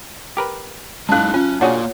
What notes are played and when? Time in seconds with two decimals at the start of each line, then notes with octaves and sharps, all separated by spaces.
0.37 G4 A#4 B4
1.09 F#2 G#3 D#4 E4 F5 A5 F#6
1.34 C#4 F4 G#5
1.61 A#3 D4 F4 F#4 G#4 C#5 F#5